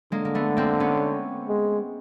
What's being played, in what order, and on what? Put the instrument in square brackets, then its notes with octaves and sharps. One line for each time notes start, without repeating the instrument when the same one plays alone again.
[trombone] D3 [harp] G#3 A#3
[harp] A#3
A3 B3
A#3 C4
B3 C#4
[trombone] G#3